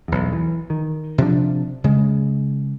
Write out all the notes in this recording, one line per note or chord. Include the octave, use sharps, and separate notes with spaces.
B1 E2
E3
D#3
C3 F3 D4
C#3 G#3